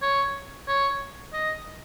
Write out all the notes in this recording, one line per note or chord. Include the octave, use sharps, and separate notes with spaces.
C#5
C#5
D#5